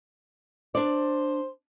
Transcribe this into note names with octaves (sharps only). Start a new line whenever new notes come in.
D4 C5 D5